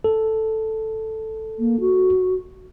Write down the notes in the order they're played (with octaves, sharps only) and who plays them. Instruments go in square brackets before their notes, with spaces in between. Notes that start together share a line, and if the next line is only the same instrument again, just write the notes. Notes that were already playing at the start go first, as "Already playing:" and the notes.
[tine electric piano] A4
[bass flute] A#3
F#4